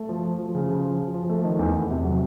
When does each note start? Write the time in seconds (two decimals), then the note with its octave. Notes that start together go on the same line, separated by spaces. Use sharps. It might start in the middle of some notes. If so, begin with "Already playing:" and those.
Already playing: A3
0.09 F3
0.25 F3
0.39 F3
0.55 C#3
0.69 F3
0.84 F3
0.99 F3
1.14 F3
1.30 A3
1.44 D#3
1.59 E2
1.75 E2
1.90 C3
2.05 F#3